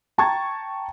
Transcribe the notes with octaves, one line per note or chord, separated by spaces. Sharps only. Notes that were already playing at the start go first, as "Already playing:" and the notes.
G5 A5 A#5 C#6 G#6 A6